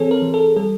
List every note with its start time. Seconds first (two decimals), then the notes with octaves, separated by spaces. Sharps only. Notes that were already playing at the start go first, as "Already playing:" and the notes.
Already playing: E3 C4 G#4 A4 C#5
0.11 A#4
0.22 E3
0.34 A4
0.56 G3 A4